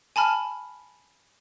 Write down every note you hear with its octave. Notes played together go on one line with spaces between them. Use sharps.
G#5 A5 B5 F6